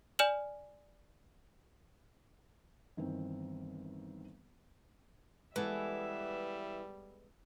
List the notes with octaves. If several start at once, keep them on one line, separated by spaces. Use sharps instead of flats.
D5 G#5 F6 E7 F#7
G1 D#3 E3 C4
E3 G3 G#3 B3 A4 E5